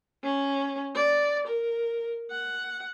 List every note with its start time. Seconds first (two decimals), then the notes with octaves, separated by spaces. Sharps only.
0.23 C#4
0.95 D5
1.47 A#4
2.31 F#5